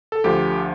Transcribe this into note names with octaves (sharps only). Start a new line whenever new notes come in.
A4
D2 D3 F3 G4